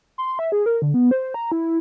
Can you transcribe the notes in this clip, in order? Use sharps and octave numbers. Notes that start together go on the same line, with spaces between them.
C6
E5
G#4
A#4
D3
B3
C5
A#5
E4